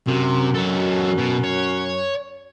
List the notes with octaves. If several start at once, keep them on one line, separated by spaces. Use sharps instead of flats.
F#2 C3
F#3 A4
B2
C#5